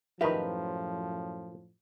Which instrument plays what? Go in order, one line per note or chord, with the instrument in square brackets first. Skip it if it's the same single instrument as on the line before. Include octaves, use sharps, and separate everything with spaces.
[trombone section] F#2 A2 F3 [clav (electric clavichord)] D#3 E4 [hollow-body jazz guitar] G4 A#4 B4